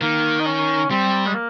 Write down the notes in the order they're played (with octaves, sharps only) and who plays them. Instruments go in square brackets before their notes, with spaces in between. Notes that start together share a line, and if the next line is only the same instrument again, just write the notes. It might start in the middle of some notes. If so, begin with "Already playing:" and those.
[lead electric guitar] D#3 [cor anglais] A#3
[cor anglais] D#4
C#4
[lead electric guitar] G3 [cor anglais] C4
[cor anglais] G#3
A#3